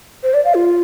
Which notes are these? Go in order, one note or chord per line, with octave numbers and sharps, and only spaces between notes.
C5
D5
F5
F4